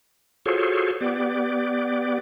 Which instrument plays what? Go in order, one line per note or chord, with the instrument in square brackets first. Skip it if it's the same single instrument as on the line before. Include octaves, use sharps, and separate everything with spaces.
[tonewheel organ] F4 F#4 G#4 A4 C5 C#5
B3 G4 D5